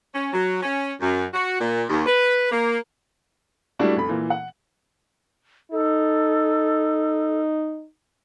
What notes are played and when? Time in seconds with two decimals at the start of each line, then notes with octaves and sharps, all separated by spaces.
0.13 C#4
0.32 F#3
0.62 C#4
1.00 F#2
1.33 F#4
1.60 A#2
1.89 D#2
2.06 B4
2.52 A#3
3.79 G3 A3 D4 E4 F#4
3.97 F1 B5
4.09 A#2 E3
4.30 F#5
5.72 D#4 A4